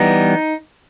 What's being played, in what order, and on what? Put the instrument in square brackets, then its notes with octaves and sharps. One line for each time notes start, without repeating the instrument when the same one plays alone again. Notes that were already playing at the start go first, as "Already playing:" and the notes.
Already playing: [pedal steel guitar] E3 G3 B3 D#4